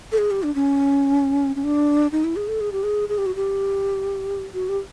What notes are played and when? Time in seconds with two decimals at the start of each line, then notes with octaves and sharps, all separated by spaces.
0.12 A4
0.18 G#4
0.31 G4
0.43 D4
0.55 C#4
1.56 C#4
1.64 D4
2.12 D#4
2.24 E4
2.36 G#4
2.48 A4
2.61 G#4
2.72 G4
2.83 G#4
3.09 G#4
3.18 G4
3.26 F#4
3.36 G4
4.54 F#4
4.69 G4